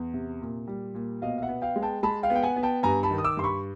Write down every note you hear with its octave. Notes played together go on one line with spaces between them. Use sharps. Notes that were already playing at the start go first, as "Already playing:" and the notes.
Already playing: E2
C3
A#2
G3
A#2
B2 D#5 F5
F5
E5 F#5
B3
F5 G5
G#3
G5 A5
G#3 A5 B5
F5 G5
B3
G5
F#5 G#5
B3
G5 A5
G2 G#5 A#5
A5 B5
D#3
D#6
D6 E6
G2 C6
B5 C#6